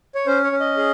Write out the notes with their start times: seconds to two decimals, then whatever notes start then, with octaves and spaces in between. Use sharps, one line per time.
0.15 C#5
0.27 C#4 C5
0.44 C#5
0.52 C#4
0.60 D#5
0.77 G#4